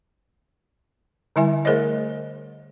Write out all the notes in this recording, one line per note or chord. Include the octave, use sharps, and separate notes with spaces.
D3 G3 E4 E5 G#5
A3 G#4 A#4 C5 C#5 D#5